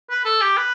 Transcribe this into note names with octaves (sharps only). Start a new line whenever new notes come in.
B4
A4
G4
B4